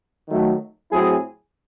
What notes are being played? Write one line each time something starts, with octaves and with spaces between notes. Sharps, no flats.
D#3 F#3 A3
A2 F#3 C4 E4 G#4